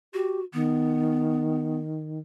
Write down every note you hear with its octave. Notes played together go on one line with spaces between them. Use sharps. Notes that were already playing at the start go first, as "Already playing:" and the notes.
F#4 G4
D#3 B3